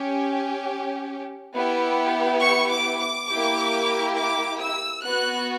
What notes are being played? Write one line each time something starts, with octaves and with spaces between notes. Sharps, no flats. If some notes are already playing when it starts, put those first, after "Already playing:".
Already playing: C#4 G4
B3 E4 G4
C#6
D6
D6
A#3 E4 G4
D6
E6
B3 F#4 F#6